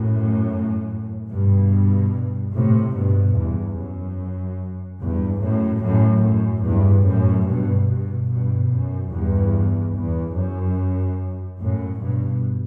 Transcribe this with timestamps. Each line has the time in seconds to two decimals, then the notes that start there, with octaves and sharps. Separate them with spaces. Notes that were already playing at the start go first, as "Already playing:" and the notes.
Already playing: F#2 A2
1.30 G2 B2
2.54 A2 C3
2.94 G2 B2
3.36 E2 G2
3.77 F#2
5.01 E2 G2
5.42 F#2 A2
5.83 F#2 A2
6.23 F#2
6.65 E2 G2
7.06 F#2 A2
7.48 G2 B2
7.89 G2 B2
8.29 G2 B2
8.71 F#2
9.12 E2 G2
9.95 E2
10.35 F#2
11.59 F#2 A2
12.00 G2 B2